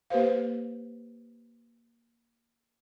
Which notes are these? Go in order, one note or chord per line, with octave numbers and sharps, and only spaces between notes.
A#3 G4 B4 C5 F5